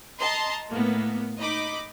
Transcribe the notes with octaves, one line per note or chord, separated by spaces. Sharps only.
D#5 A5 A#5 C6
A2 A#3 B3
D#4 D#5 B5 D6